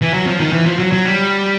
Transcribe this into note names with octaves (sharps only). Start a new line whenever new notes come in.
E3
F#3
F3
D#3
E3
F3
F#3
F#3
G3